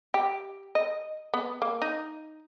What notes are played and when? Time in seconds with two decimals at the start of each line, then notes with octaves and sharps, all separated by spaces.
0.14 G4
0.75 D#5
1.34 B3
1.62 A#3
1.82 D#4